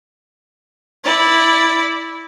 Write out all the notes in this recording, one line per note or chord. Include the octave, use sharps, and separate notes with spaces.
E4 D5